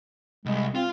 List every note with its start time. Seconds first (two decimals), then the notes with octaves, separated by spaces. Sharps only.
0.46 C2 G#3
0.75 C4 F4